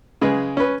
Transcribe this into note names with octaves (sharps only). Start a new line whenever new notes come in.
C#3 G#3 B4
C#4 B4